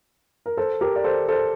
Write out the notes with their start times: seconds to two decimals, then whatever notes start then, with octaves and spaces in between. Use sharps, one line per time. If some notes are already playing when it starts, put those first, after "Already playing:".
0.46 A#4
0.57 A4 C5
0.81 G4 A#4
0.96 D5
1.04 A4 C5
1.28 A4 C5